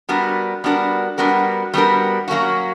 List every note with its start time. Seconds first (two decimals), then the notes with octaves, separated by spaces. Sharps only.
0.09 G3 B3 D4 F#4 A#4
0.64 G3 B3 D4 F#4 A#4
1.18 G3 B3 D4 F#4 A#4
1.74 G3 B3 D4 F#4 A#4
2.28 F#3 A#3 C#4 F#4